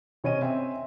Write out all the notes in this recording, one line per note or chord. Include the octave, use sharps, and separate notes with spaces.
C3 C#4 C#5 D#5 G#5 D#7
C4 E5 G#5